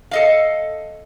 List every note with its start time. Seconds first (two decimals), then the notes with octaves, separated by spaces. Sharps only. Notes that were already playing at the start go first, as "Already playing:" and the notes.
0.11 A4 D#5 F5